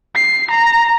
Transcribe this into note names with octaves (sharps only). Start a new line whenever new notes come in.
C7
A#5